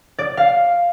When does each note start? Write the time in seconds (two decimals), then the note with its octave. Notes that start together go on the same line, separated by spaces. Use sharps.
0.19 D5
0.37 F5